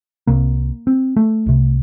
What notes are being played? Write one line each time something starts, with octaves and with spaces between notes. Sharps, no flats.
C2 C3 A#3
C4
A3
C2 C3